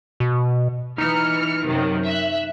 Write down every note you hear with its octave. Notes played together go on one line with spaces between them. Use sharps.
B2
E3 D#4 F6 C#7
F#2 C3 D#3
E5 F#6